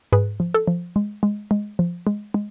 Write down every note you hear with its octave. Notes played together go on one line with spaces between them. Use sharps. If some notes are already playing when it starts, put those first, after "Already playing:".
G#2 G#4 B4
F3
A4
F3
G#3
G#3
G#3
F3
G#3
G#3